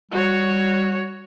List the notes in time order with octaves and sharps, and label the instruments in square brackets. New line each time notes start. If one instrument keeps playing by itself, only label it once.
[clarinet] G3 [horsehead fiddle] F#4 C#5